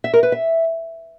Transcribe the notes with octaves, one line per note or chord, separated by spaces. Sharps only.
E5
A#4
B4
E5